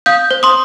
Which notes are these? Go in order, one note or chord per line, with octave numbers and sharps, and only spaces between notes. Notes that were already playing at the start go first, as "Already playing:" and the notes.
F5 D#6 G6
C5
C6 D#6